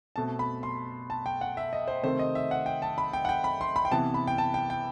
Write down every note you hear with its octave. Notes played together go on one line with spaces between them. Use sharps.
B2 A3 C4 A5
B5
C6
A5
G5
F#5
E5
D#5
C5
C3 D#3 A3 C4 C5
D#5
E5
F#5
G5
A5
B5
G5
F#5
G5
B5
C6
B5
G5
C3 E3 B3 A5
B5
G5
A5
G5
G5